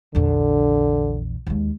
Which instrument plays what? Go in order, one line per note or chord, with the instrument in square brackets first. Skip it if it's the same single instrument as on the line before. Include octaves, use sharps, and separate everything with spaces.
[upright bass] A#1 E2 [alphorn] D3
[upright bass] D#2 G#3